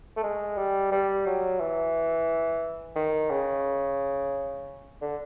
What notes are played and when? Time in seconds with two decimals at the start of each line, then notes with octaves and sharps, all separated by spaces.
0.17 A3
0.23 G#3
0.57 G3
0.92 G3
1.26 F#3
1.60 E3
2.96 D#3
3.30 C#3
5.02 D3